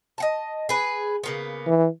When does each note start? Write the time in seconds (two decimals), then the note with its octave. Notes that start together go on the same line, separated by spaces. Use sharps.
0.18 D#5 F#5 A5
0.69 G#4 B4
1.24 C#3 A#3 B3
1.67 E3